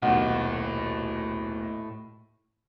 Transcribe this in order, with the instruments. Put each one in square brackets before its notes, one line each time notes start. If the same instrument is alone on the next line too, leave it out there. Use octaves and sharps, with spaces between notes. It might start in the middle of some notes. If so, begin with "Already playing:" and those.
[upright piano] D#1 B1 [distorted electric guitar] A2 [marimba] F#5